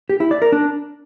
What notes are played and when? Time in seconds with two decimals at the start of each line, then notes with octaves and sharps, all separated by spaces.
0.09 G4
0.20 E4
0.31 D5
0.42 A#4
0.52 D4